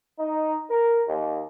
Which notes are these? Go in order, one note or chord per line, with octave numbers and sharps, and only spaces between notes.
D#4
A#4
D#2